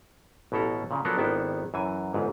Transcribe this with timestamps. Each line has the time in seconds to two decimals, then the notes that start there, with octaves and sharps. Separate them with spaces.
0.52 A1 B2 E4 A4 A#5
0.91 A#2 C#3
1.05 F3 F#3 B3 D4 A4 A#4
1.18 G#1 D#3 B3 D4 E4 A4
1.74 F#2 E3 G#5
2.14 G1 G#2